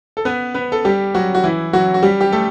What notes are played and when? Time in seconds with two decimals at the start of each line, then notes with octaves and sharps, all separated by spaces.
0.17 A4
0.25 B3 B4
0.54 B3 B4
0.72 A4
0.85 G3 G4
1.15 F#3 F#4
1.35 F#4
1.43 E3 E4
1.73 F#3 F#4
1.94 F#4
2.03 G3 G4
2.21 G4
2.32 A3 A4